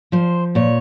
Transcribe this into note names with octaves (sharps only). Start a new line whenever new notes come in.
F3 C5
A#2 C#5